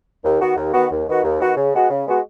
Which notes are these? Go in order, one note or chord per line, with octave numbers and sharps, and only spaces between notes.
D#2
D#3 B3 F#4
D#2
D#3 B3 F#4
D#2
D#3 B3 F#4
D#2
D#3 B3 F#4
C#3
G#3 B3 F#4
C#3
G#3 B3 F#4